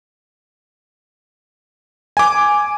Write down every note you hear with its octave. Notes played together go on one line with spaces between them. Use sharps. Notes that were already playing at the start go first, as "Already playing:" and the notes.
G#5 D6